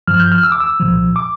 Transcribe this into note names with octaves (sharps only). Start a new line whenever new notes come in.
G2 F3 F6
G6
F6
E6
D6
E6
C2 A#2 F3
D6